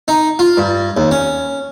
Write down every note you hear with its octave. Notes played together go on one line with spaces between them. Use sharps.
D#4
F4
G2
D#2
C#4